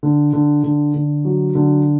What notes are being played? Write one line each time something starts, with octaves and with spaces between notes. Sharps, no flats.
D3
D3
D3
D3
F#3
D3